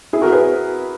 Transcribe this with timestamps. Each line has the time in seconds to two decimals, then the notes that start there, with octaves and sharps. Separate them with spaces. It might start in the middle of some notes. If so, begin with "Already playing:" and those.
0.13 E4 G#4
0.22 F#4 A#4
0.32 G#4 B4